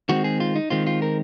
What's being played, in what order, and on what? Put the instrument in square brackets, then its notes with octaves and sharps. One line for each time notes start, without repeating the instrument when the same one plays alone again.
[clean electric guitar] D#3 G#3 C4 F#4
G#4
F4
D#4
D#3 G#3 C4 F4
F4
A#4